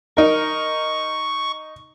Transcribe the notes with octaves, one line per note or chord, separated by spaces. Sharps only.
D#4 A#4 C#6